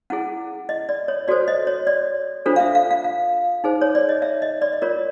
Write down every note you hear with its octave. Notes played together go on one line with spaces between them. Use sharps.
C#4 E4 G#4 F#5
D#5
D5
C#5
F#4 A4 C5 D5
D#5
C#5
D5
D4 F4 A4 C5
F5
E5
F5
F5
F5
D#4 G#4 C5
C#5
D5
D#5
E5
D#5
D5
D#5
F4 A#4 C#5 D5